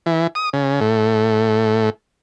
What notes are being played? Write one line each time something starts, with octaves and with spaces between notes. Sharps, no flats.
E3
D#6
C#3
A2